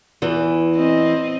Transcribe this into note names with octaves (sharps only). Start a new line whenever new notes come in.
E2 E3
C4 D#5